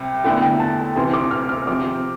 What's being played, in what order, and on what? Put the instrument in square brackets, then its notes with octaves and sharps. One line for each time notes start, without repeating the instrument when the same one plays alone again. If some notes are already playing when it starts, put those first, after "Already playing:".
Already playing: [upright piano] C2 C3 [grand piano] G5
[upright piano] E2 D3 A3 E4 [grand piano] G5
[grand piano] G5
A5
[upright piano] D2 C3 E3 [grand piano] C6
[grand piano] D6
F6
F6
[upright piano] C3 F3 C4 [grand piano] D6